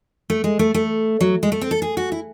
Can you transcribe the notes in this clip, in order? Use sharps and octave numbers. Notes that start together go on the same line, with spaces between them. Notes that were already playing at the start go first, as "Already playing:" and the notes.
A3
G#3
A3
A3
F#3
G#3
A3
C4
A4
G#4
F#4
E4